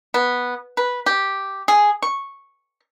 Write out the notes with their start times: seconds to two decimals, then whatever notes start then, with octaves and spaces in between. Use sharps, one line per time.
0.14 B3
0.77 B4
1.06 G4
1.68 G#4
2.02 C#6